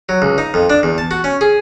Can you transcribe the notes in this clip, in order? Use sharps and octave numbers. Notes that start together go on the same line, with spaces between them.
F#3
C#2
D#4
F2
D4
E2
A5
F#4
C#4
G#4